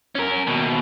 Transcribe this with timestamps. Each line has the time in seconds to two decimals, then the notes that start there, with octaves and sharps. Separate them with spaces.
0.15 C#4 A#4
0.47 D#2 B2